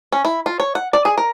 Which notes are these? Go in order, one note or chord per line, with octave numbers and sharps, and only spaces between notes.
C#4
E4
F4
C#5
F#5
D5
G#4
A#4